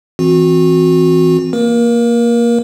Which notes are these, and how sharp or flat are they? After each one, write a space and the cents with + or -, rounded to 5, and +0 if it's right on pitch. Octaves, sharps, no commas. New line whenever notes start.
E3 +0 C4 +0 F#4 -30
A#3 +0 A#4 +30